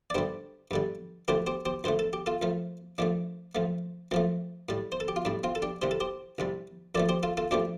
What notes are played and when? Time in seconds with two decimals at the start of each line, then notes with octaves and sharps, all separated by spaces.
0.10 D5
0.14 G2 D3 G3 G4 C5
0.71 G2 D3 G3
1.28 F2 D3 A3 G4 C5
1.47 G4 C5
1.65 G4 C5
1.84 F2 D3 A3 C5
1.99 A4
2.13 G4
2.26 F4 A4
2.42 F2 F3 A3
2.98 F2 F3 A3 D4
3.55 F2 F3 A3
4.11 F2 F3 A3 C4
4.69 A2 G3
4.92 C5
5.00 A4
5.08 G4
5.16 F4
5.25 A2 G3 D4
5.44 C4 F4
5.55 A4
5.62 D4 G4
5.82 C2 C3 G3 C5
5.91 A4
6.00 G4 C5
6.38 C2 C3 G3
6.95 F2 F3 A3 A4 D5
7.09 G4 C5
7.23 F4 A4
7.37 F4 A4
7.51 F2 F3 A3 D4 G4